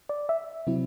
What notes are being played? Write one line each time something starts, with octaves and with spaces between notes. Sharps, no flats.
D5
E5
C3 F#3 C4 E4